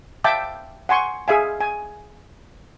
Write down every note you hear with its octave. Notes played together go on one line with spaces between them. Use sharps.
E5 F5 G5 A5 D6 E6
F#5 G#5 C6 C#6
G#4 E5 F5 G#5
G#5